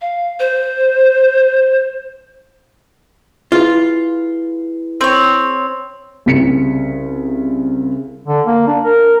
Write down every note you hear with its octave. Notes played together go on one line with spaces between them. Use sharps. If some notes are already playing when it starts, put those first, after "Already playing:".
F5
C5
E4 F4 G#4 B4
C4 C#5
C2 C#3 B6 C#7
D3
A#3
D4
A#4